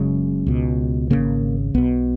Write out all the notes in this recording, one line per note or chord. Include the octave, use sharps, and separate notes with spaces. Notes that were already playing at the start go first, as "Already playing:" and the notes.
Already playing: F#1 F#2 C#3 G#3
C#2 B2
G#1 F#2 C#3 A#3
B1 B2 B3